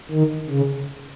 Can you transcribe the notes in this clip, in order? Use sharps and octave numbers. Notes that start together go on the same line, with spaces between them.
D#3
C#3